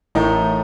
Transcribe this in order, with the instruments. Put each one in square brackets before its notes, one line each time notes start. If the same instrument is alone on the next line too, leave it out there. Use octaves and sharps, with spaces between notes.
[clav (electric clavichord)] A1 A2 [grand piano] A3 D#4 A#4